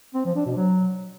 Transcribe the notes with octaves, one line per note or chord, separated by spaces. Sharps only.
C4
F3
D4
B2
F#3